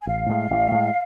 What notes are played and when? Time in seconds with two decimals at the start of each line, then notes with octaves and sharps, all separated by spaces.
0.01 G#5
0.07 A1 F5
0.29 A2 G#3
0.51 A1
0.72 A2 G#3